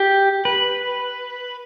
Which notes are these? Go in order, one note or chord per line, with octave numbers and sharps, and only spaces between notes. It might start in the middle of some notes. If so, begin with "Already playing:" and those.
Already playing: G4
B4